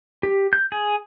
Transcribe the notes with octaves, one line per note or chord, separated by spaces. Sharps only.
G4
G6
G#4